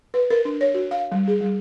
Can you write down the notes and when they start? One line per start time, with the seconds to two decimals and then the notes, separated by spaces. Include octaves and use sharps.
0.14 B4
0.31 A#4
0.45 D4
0.61 C#5
0.74 F#4
0.91 F5
1.12 G3
1.28 G#4
1.41 G3